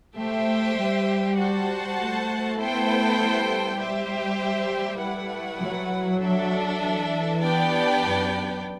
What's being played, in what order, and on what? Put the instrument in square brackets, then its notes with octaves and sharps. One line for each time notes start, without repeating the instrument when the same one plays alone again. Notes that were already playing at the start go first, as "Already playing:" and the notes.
[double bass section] A3 [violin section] G4 C5 E5
[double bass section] G3
[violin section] F#4 C5 F#5 A5
[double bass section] A3
[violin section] B3 E4 A4 C5 G5
[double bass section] G3
[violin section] G4 C5 E5
A3 E4 B4 F#5
[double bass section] F#3
[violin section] D4 A4 E5
[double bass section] E3
[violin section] B3 D4 G4 D5 G5
[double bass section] F#2